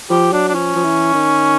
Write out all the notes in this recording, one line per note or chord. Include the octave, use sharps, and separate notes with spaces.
F3 G4
F#3 D4
D4
F3 C#4
F3
E3
D#3